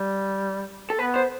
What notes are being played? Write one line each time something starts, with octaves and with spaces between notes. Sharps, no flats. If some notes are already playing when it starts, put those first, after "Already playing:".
Already playing: G3
A4
B3 B4
C5